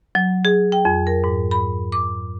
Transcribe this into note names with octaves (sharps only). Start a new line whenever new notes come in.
F#3
G#4
G5
F2
A#4
G#2
B5
D6